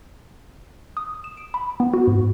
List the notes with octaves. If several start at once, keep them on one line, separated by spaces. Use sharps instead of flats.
D#6
E7
D7
B5
B3
F#4
G#2